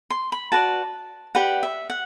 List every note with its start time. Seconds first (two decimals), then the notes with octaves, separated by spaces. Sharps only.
0.10 C6
0.32 B5
0.52 F#4 B4 D5 A5
1.35 G4 B4 D5 F#5
1.63 E5
1.90 F#5